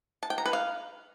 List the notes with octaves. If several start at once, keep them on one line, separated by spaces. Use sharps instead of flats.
A5
G5
A#5
B4
F5